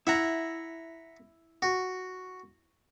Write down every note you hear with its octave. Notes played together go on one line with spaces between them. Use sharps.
E4 E5 F#5 A#5
F#4